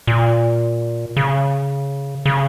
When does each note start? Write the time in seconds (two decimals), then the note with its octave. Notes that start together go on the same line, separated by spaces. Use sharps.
0.07 A#2
1.17 C#3
2.26 C#3